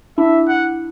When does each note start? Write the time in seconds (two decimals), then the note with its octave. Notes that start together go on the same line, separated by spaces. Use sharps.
0.18 D4 E4 E5
0.48 F#5